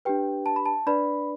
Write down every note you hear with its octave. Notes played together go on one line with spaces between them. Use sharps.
D4 G4 B4 G5
A5
B5
A5
D4 B4 D5 B5